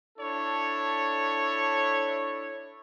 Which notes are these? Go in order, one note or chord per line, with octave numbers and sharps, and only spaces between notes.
D4 E4 A4 C#5